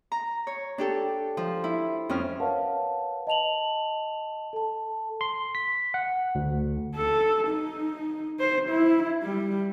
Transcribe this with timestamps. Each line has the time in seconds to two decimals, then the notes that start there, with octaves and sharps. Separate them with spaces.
0.12 A#5
0.47 C#5
0.78 D4 G4 A4
1.37 F3
1.64 E4
2.09 F2 C#4 F6
2.40 A#4 B4 C#5 F5 F#5 A5
3.27 D#5 A5 F7 F#7
4.53 A4 A5
5.21 C6
5.55 B6
5.94 F#5
6.35 D2
6.96 A4
7.48 D#4
8.40 C5
8.70 E4
9.23 G3